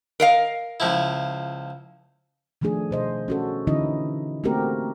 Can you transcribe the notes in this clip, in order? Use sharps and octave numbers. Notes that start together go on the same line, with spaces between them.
A#4 D#5 F5
C#2 F3 E4
D#3 F3 A3 D4 G#4
B2 C5 D#5
C#4 F#4 A4
D3 E3 C#4 D#4 E4 D#5
A3 A#3 C4 F#4 G4 A#4